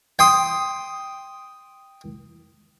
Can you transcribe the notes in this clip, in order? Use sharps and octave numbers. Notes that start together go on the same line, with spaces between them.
G5 C6 D#6